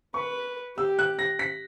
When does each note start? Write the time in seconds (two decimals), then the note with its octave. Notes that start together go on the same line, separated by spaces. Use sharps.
0.14 B4 C#6
0.77 G4 E6
0.99 F#6
1.19 A#6
1.39 B6